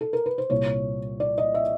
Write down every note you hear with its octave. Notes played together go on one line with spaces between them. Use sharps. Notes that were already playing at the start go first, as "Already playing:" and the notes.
A4
A#4
B4
C5
C2 A#2 G3 C#5
D5
D#5
E5